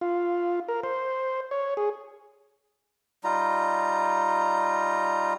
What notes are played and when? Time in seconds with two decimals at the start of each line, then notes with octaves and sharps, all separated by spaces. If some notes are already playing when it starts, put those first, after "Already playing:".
0.01 F4
0.69 A#4
0.83 C5
1.51 C#5
1.77 G#4
3.24 G3 D#4 F4 A#5